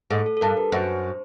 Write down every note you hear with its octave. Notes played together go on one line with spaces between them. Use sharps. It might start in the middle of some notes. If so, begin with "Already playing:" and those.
G#2 A4
A4
A4
G2 A#4
B4
F#2 C5